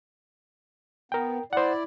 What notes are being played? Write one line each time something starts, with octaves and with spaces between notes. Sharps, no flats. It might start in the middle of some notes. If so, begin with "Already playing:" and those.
B3 A#4 G5
E4 C5 D5 F#5